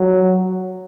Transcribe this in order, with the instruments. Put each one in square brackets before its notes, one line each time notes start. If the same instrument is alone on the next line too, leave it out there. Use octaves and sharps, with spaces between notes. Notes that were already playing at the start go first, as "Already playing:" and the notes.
Already playing: [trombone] F#3